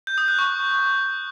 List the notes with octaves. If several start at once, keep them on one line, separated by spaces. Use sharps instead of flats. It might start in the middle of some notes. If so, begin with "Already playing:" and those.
G6
D#6
F#6
C#6